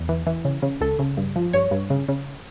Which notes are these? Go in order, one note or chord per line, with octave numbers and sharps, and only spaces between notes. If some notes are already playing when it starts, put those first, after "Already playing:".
Already playing: E2
E3
E3
C#3
C#3
C#2 A4
C#3
G2
F3
G2 C#5
G2
C#3
C#3